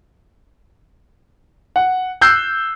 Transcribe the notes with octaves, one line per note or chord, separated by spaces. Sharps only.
F#5
E6 F#6 G6 C7